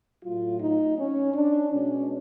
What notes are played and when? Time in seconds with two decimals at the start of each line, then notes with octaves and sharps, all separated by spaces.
0.24 A2 F#3 A3 F4
0.60 D#4
0.99 C#4
1.35 D4
1.72 B2 G#3 C#4